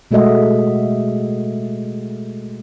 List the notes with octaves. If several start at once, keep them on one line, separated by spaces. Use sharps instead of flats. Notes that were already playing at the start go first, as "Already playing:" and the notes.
B2 G#3 A3 F#4 D#5 E5